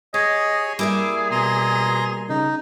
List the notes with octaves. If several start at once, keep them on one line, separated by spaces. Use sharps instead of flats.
G4 G#4 C#5 D#5 G#5
G3 A#3 E4 G#4 E5 D6
B2 G#5 A#5 C6
C#3 D#4